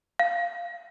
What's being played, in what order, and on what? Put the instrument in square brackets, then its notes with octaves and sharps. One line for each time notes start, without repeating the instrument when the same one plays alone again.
[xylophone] F5